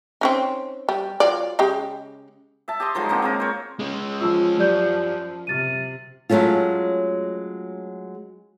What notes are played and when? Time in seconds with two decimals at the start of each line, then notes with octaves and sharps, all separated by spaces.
0.21 C4 C#4 D#4
0.89 G3
1.20 F#3 F4 D5
1.59 C#3 G#3 G4
2.68 E5 A5
2.80 G4 D#5 C6
2.95 D#3 F3 F#3 G#3
3.09 D3 F#3 A#3 C4
3.22 G#3 C4 A#4
3.40 C5 C#5
3.79 G#3 C#4
4.20 F3 F4 E6
4.59 F#2 G4 D5 G6
5.47 C3 F6 A6 D#7
6.30 F#3 G#3 A3 C#4 F4